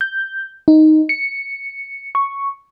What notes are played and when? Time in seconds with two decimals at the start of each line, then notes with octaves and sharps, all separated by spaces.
0.01 G6
0.68 D#4
1.09 C#7
2.15 C#6